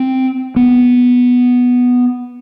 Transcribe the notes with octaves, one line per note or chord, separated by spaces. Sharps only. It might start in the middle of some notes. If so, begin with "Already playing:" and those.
Already playing: C4
B3